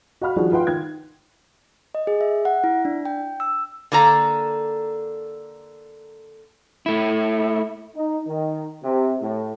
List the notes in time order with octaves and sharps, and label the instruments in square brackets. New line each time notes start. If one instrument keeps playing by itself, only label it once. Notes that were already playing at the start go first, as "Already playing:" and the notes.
[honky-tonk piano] F#4 F5 F#5 B5 F6
D#3 F3 G3 D4 F#4 G#4
F4 B4 F#5 G5 C6
D#3 G#6
[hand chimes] D#5
G#4
E5
F#5
E4
D4
G5
E6
[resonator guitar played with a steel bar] D3 A#3 A4 A#5
[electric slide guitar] A3 E4
[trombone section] D#4
D#3
C3
A2